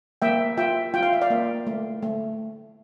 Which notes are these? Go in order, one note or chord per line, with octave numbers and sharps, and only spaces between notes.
A#3 E5 G5
F4 E5 G5
F4 G5
F5
E5
D5 F5
A#3
A3
A3